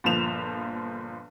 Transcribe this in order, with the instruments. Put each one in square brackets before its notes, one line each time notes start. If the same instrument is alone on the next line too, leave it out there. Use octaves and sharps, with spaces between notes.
[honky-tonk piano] G1 A#2 F3 E7 F7